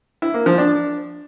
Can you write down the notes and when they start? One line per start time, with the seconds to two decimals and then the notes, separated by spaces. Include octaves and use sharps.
0.22 E4
0.34 A#3
0.46 F3
0.58 D4